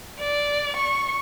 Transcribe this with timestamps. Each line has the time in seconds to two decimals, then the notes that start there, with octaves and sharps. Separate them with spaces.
0.19 D5
0.77 C#6